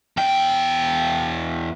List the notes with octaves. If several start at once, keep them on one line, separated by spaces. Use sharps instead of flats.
E2 G5